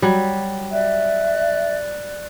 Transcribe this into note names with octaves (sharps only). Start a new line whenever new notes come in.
F#3 G3
D5 E5 F#6